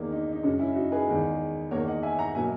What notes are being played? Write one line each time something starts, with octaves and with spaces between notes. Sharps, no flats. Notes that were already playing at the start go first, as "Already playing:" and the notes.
Already playing: E2 D#3 A#3
D#4
D#4
F#2 C#3 G#3 C#4
C#4 E4
D#4 F#4
G#4 B4
E2 D#3 G#3
E2 D#3 A#3 A#4 C#5
D#5 F#5
E5 G#5
F#5 A#5
B2 F#3 A#3 E5 G#5